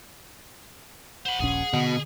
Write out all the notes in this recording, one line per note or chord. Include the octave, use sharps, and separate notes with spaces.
C5 F#5 B5
D#1 A#1 C#4 G#4
B2 D3